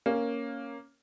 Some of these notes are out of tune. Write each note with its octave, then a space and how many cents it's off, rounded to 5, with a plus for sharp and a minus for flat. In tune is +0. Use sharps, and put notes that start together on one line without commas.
A#3 +0 C#4 +0